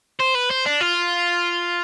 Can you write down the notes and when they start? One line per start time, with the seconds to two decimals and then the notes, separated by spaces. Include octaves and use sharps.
0.20 C5
0.35 B4
0.50 C5
0.65 D4
0.80 F4